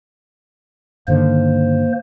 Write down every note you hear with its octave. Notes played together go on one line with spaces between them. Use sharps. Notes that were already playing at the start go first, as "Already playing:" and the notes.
G2 D3 D#3 A#3 C5